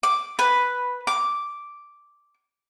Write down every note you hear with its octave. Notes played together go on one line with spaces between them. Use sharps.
D6
B4
D6